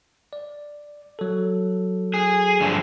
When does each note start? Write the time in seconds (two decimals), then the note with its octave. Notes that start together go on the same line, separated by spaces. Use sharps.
0.33 D5
1.19 F#3 A4
2.14 G#4
2.60 G2 D3 F3